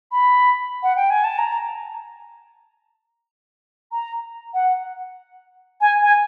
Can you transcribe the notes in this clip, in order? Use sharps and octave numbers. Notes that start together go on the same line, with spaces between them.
B5
F#5
G5
G#5
A5
A#5
A#5
F#5
G#5
G#5